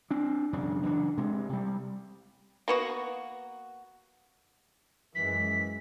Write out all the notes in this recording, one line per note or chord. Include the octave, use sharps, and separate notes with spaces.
C4 D4
E1 F#2 C#3 D4
F#1 E3 D4
C3 G#3
C3 G3
A#3 B3 F#4
F#2 E3 G#3 B6